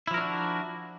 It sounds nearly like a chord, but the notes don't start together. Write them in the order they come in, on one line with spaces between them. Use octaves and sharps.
E4 F3 A#4 D4 F#4